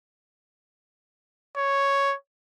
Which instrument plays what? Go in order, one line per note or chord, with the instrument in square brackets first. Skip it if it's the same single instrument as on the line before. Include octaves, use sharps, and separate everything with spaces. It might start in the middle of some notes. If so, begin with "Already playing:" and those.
[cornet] C#5